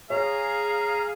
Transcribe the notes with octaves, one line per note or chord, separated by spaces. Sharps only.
G#4 C#5 F5 A#5